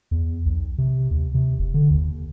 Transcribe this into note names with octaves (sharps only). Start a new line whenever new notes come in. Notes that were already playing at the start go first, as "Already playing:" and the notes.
E2
B1
C3
D#2
C3
F#1
D3
D#2